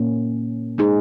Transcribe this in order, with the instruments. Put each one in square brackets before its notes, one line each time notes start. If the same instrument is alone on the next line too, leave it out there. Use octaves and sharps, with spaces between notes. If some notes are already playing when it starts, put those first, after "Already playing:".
Already playing: [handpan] A#2 A#3 C#4
G#3 D#4 G#4